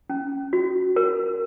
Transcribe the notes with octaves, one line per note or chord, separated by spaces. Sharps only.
C#4
F#4
A#4